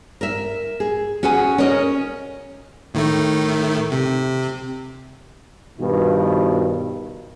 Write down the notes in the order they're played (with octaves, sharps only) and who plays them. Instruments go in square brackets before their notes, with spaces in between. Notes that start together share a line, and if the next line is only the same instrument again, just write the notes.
[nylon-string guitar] A#4 E5
G#4
C#4 F#4 G#4 F#5 G#5
C#4 A#4 C#5 D#5
[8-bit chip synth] A2 D#3 A3
C3
[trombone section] G2 B2 D#3 F3